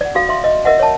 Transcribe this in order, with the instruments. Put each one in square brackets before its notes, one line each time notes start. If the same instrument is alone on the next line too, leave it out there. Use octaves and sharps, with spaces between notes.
[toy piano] D5 F#5
F#4 A4 F5
E5 C6
D#5
A#4 D#5 E5 F#5
C#5 A5